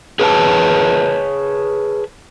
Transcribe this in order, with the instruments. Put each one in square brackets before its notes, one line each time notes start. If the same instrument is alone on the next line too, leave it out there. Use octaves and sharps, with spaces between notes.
[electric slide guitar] G#4 B4 C#5 F#5 A5